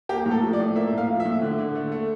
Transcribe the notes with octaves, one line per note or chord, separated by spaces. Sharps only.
A#3 G4
A2
A4
F3
D5
A2
A#3 E5
A2
F5
F3
E5
A2
D3
D3
A3
A3